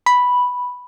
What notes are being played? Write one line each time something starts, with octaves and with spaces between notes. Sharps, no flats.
B5